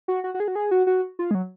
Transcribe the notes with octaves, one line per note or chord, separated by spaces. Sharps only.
F#4
F#4
F#4
G#4
F#4
G#4
F#4
F#4
F4
G#3
F#3